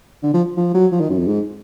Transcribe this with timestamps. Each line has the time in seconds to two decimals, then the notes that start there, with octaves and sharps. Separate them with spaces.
0.23 D3
0.34 F3
0.57 F3
0.74 F#3
0.92 F3
1.01 D#3
1.10 F#2
1.18 F2
1.27 G#2